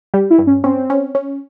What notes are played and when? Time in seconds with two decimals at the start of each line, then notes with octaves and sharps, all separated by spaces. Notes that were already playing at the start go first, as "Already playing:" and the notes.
0.14 G3 G4
0.30 E4
0.38 G2
0.47 C#4
0.64 C4 C#4
0.90 C#4
1.15 C#4